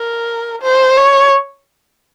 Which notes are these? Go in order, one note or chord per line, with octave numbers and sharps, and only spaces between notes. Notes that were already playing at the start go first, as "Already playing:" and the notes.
Already playing: A#4
C5
C#5